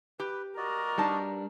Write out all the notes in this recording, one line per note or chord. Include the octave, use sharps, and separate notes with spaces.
G4 B4
F#4 A#4 D5 D#5
G3 D4 D#4 A5